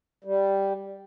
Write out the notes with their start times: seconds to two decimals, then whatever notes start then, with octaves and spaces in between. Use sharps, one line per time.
0.24 G3